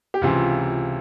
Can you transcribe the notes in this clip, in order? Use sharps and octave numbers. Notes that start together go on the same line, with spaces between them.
G4
C#2 C3 E3 F4